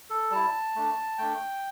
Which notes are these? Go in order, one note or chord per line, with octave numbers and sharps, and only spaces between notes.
A4
G3 E4 A5
A3 D4
A3 D4 G5